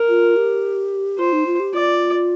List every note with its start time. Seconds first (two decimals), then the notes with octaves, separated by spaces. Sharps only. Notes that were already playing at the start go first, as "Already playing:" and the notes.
Already playing: A#4
0.09 F4
0.36 G4
1.19 F4 C5
1.32 D#4
1.46 F4
1.60 G4
1.74 F4 D5